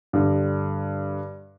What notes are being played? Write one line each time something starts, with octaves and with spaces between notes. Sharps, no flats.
G2 D3 G3